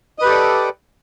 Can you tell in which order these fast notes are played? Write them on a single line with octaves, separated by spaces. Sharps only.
D#5 B4 G4 A4 D5